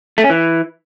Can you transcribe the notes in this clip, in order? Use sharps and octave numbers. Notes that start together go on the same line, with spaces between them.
A3
C#4
E3